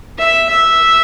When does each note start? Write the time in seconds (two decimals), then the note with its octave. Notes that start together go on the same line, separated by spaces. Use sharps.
0.18 E5
0.49 E5